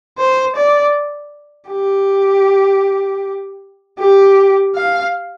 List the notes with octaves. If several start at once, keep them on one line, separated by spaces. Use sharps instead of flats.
C5
D5
G4
G4
F5